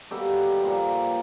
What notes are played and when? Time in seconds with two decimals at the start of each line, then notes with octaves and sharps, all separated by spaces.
0.11 B2 G3 A#3 G4 A4
0.61 A#2 F3 A#3